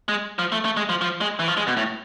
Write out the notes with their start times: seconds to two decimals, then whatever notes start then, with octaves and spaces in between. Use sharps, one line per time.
0.09 G#3
0.39 F3
0.52 A3
0.65 A3
0.77 G#3
0.89 F3
1.01 F3
1.21 G#3
1.39 E3
1.48 F3
1.57 G#3
1.67 B2
1.77 A2